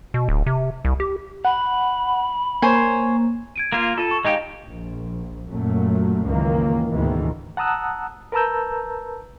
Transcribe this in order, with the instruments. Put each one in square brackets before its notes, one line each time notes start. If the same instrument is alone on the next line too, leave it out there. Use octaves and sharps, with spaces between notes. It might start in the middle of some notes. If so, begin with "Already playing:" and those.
[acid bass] B2
D1
C3
C2
G4
[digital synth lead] F#5 [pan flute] B5
[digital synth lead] A#3 [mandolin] C5 C#5 G#5
[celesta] G#6 D7 D#7
[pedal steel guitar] A#3 F4
[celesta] F4 D#7 [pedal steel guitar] A4
[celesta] C#6
[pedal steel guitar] G#3 D#4 G4 [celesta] D#5 F5
[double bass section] A#1
F#2 A#2 F#3 A3
C#2 F#2 D#3 E3 A#3
D2 G#2 B2 D#3 E3 G#3
[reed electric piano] F#5 A5 A#5 D#6 E6 F#6
A#4 B4 A5 A#5 E6 G6